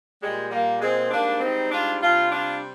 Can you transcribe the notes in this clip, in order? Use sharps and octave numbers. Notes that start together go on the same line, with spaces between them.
A#2 G3 G#3
G3 A#3
G#3 C4
G#2 G3 A#3 D4
C4 D#4
D4 F4
C3 G3 D4 F4
D4 F4